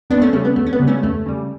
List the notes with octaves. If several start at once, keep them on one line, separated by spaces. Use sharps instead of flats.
E2 B3 D4
A3 C#4
C#3 G3 A3 C#4
B3
E2 A3
C#4
B3
C#3 G3
A3 C#4
E2 A3
C#3 G3